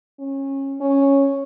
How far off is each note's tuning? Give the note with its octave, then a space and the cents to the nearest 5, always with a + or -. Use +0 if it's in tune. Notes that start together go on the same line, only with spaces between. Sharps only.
C#4 -25
C#4 -5